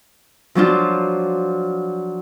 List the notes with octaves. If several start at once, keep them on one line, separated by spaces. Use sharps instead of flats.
F3 F#3 D4 F4